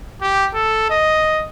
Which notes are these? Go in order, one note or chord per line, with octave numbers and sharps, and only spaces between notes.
G4
A4
D#5